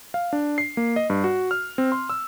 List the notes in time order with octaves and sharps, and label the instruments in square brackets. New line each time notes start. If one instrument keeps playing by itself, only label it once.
[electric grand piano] F5
D4
C7
A#3
D#5
G2
F#4
F6
C4
C6
E6